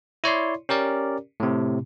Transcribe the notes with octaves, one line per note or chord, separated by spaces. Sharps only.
E4 C#5 D5 C6
C#4 G4 A#4 D5
A2 C3